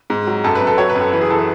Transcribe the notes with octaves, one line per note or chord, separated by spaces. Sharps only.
G#2
F#3
F#2 A4
B4
F#2
A4
F#3 C#5
B4
F#2
A4
E3 B4
G#4
E3 A4
B4